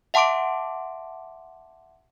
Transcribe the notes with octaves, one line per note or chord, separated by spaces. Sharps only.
E5 F#5 A5 C6 D6 D7